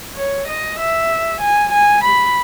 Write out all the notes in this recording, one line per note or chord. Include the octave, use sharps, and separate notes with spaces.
C#5
D#5
E5
G#5
G#5
B5